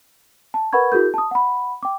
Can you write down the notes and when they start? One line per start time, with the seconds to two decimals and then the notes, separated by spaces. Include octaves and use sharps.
0.54 A5
0.73 A#4 B4 F#5 B5 C#6 G#6
0.92 E4 F#4 G#4 A#4 G6
1.14 A5 D#6
1.31 F#5 B5
1.83 G5 D6